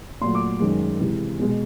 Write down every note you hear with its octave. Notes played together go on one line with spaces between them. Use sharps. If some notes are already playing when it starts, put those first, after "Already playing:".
A#2 F#3 A3 C6
D6
F#2 D#3 G#3
C3 E3 G#3
B2 G#3